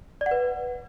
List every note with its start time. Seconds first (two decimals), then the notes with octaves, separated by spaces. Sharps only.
0.21 D5
0.26 F#5
0.31 B4